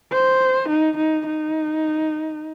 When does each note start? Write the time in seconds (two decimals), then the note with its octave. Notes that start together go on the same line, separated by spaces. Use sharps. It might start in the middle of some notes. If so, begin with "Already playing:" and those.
0.12 C5
0.69 D#4
0.97 D#4
1.26 D#4